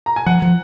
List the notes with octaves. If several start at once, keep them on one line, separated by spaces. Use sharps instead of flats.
A#5
G#5
F3 F#5
F3